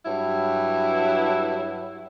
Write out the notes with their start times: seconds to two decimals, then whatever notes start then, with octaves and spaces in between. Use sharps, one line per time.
0.05 G2 F#3 E4